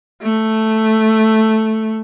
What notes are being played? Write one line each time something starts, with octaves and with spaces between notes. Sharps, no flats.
A3